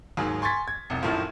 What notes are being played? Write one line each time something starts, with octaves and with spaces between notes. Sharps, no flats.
D#2 G#2 F#3 G#4
G#5 C6 C#6 G#6 A6 B6
G#6
F1 C2
A#1 F#2 A2 D#3 F3